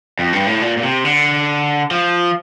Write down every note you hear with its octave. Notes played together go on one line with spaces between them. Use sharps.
F2
G2
A2
A#2
A#2
C3
D3
F3